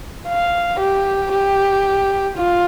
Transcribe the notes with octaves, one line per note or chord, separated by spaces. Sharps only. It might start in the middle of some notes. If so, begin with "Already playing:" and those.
F5
G4
G4
F4